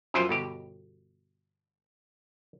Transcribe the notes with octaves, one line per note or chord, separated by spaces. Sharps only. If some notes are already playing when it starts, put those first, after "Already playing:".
F#2 E3 F3 E4 F4 C5
G1 B2 G4